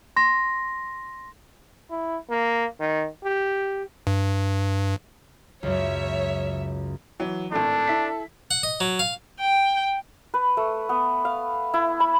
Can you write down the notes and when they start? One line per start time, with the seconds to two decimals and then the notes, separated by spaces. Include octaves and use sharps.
0.16 C6 A#6
1.90 E4
2.30 A#3
2.80 D#3
3.24 G4
4.07 G2
5.63 C#2 F#2 C#5 E5
7.20 E3 F#3
7.51 G#1 A2 D4 A4
7.87 E4 B6
8.51 F#5
8.63 D#5
8.80 F#3
8.99 F5
9.40 G5
10.34 B4
10.57 A3
10.89 B3
11.25 F5
11.74 E4
12.00 B5